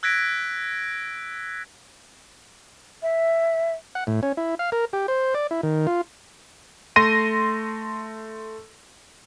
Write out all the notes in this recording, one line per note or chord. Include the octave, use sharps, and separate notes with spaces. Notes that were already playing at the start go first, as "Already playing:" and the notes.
E6 F#6 G#6 A#6 B6 D7
E5
F#5
A2
C#4
E4
F5
A#4
G4
C5
D5
E4
D#3
F4
A3 C6 A#6 D#7